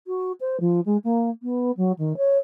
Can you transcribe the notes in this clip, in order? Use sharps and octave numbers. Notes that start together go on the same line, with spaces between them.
F#4
C5
F3
G#3
A#3
B3
F#3
D#3
C#5